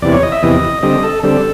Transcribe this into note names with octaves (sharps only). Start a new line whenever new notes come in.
E2 C3 E3 D5
C#5
D#5
E5
E2 C3 E3 D#5
D3 G3 C4 D#5
A4
D3 G3 C4 A4